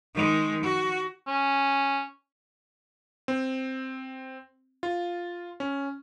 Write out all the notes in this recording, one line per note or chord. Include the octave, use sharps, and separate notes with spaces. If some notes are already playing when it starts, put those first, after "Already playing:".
D#3 G#3
F#4
C#4
C4
F4
C#4